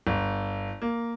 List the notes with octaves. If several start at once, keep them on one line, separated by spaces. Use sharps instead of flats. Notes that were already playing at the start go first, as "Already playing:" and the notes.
G1
A#3